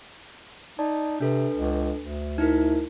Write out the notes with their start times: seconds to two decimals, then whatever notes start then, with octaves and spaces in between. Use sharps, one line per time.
0.79 D#4 D5 A5
1.20 C3 D4 A4 B4
1.55 C#2
2.00 D2
2.38 D#4 E4 A#4